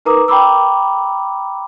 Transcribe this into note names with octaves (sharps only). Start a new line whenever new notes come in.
D#4 A#4 B4 A#5 D6 D#6
G5 A#5 B5 D6 E6